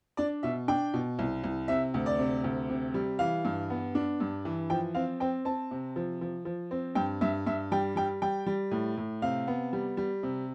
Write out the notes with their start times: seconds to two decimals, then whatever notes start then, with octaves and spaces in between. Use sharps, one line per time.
0.17 D4 D5
0.43 B2 E5
0.68 D4 G5
0.94 B2
1.19 C2
1.44 C2
1.68 C3 E5
1.94 D2
2.06 D5
2.19 C3
2.44 D2
2.70 C3
2.94 G3
3.19 E3 F5
3.45 G2
3.70 B3
3.95 D4
4.20 G2
4.45 E3
4.70 F3 G5
4.94 C4 F5
5.20 C4 G5
5.45 C4 A5
5.71 C3
5.96 F3
6.21 F3
6.45 F3
6.71 C4
6.95 G2 G5
7.21 G2 E5
7.46 G2 E5
7.72 G3 G5
7.96 G3 G5
8.22 G3 G5
8.46 G3
8.71 A2
8.97 A2
9.22 C3 F5
9.47 B3
9.73 G3
9.97 G3
10.23 C3